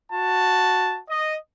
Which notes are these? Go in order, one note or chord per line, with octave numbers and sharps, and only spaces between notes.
F#4 A5
D#5